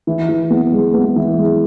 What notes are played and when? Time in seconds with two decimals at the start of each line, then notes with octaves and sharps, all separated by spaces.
0.07 E3
0.29 E3
0.50 B3
0.73 G#3
0.94 B3
1.16 E3
1.38 G#3